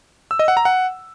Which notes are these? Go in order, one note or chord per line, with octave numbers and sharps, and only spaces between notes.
E6
D#5
F#5
A#5
F#5